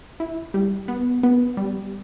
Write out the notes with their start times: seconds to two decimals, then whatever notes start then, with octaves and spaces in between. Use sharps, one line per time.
0.20 E4
0.54 G3
0.88 B3
1.23 B3
1.57 G3